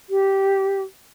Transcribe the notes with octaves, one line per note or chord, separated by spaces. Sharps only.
G4